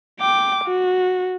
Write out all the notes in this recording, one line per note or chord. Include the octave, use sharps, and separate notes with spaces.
G5 D6
F#4